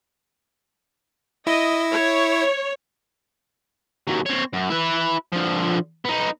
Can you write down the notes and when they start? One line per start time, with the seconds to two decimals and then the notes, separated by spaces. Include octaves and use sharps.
1.47 E4 D#5
1.91 C#5
4.07 D#2 F#3
4.26 C4 C#5
4.53 F#2
4.70 E4 B4
5.32 D3 F3
6.05 B3 D#4